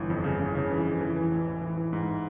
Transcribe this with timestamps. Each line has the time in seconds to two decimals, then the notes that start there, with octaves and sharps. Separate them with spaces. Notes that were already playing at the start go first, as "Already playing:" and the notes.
Already playing: G1 E3
0.10 F2
0.24 C#3
0.40 C#3
0.55 C#3
0.71 E3
0.85 F2
1.01 E3
1.16 E3
1.31 A1
1.47 A1
1.61 E3
1.77 E3
1.93 G#2